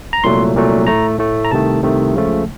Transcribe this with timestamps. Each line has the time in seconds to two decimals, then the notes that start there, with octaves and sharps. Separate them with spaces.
0.13 A#5
0.24 C2 A#2 F#3 A3 C6
0.55 C2 A#2 F#3 A3
0.87 A2 A3 A#5
1.19 A2 A3
1.45 A#5
1.51 C2 C3 D#3 A3 A5
1.82 C2 C3 D#3 A3
2.14 C#2 C#3 F3 A3